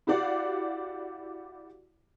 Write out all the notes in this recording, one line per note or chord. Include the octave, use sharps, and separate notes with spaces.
E4 F#4 G4 D5 F5 F#5